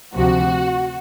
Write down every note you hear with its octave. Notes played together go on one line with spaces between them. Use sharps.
D2 C3 F3 F#4